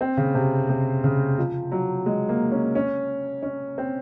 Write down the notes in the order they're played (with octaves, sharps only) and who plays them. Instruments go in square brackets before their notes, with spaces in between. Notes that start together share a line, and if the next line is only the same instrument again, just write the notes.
[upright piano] C4
C#3
C3
C3
C#3
F3
F#3
G#3
A#3
C#4
C#4
C#4
C4